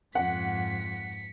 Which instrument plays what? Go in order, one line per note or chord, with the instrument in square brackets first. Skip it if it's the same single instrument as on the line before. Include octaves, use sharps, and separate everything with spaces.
[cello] F2 [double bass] G#2 [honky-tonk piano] F#5 [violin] B6 C#7